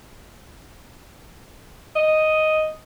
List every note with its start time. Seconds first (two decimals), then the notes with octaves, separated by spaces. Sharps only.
1.96 D#5